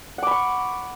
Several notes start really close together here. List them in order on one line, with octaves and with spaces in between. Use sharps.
F#5 D6 B5 C#6